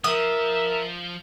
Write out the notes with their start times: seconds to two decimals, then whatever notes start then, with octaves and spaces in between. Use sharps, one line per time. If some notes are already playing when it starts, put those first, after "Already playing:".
0.04 F3 A#4 E5 D#6